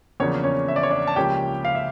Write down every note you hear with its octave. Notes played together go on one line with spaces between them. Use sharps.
E2 C#3 F3 A#3 C#4 D4 C#5
C#4 C#5
E5
D5
C#5
D4 D5
A5
C#2 C#3 F3 A#3 C#4 G4 G5
F5
E5